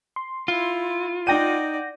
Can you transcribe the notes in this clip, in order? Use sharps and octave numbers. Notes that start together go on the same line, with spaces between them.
C6
E4 F4
D#4 D5 F#5 G5 G6 A#6 D#7